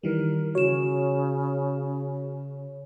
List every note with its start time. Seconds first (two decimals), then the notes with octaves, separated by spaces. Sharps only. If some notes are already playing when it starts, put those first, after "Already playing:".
0.03 D#3 E3 G3 A#4
0.55 C#3 F#4 C#5 E7